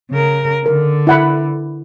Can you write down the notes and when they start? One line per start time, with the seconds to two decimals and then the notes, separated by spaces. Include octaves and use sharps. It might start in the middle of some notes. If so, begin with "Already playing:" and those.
0.10 C#3 A#4
0.66 D3 A#4
1.07 E4 F#5 B5